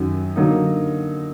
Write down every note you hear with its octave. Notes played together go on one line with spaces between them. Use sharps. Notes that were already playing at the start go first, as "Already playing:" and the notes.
Already playing: F#2 D#3 F#3
D3 F#3 A#3 D#4